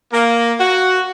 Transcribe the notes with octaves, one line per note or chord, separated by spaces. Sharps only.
A#3
F#4